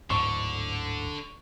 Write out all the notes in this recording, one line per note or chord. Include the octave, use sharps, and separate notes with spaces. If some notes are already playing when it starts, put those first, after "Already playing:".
D1 G#2 D3 D4 C#6